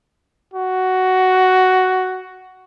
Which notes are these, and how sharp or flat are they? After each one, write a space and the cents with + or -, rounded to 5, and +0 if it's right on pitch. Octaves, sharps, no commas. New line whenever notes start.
F#4 +10